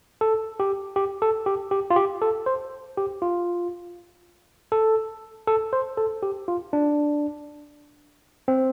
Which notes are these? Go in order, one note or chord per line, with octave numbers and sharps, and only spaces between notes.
A4
G4
G4
A4
G4
G4
F4
G4
A4
C5
G4
F4
A4
A4
C5
A4
G4
F4
D4
C4